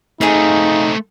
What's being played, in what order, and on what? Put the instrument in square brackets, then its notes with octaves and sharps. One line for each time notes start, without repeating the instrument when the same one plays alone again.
[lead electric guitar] A3 C4 [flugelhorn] D#4 [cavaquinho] G#4 D#5 F5